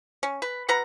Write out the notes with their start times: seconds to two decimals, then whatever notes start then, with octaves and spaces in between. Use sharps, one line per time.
0.23 C#4
0.42 B4
0.68 B2 B4 F#5 A#5